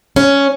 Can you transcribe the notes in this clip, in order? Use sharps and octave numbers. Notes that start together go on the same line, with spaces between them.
C#4